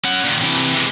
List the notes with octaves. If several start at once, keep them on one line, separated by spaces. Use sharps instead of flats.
C#4 F#5
A#2 D#3
C3 E3
E3 G#3